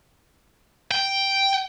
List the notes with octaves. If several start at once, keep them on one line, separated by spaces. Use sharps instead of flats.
G5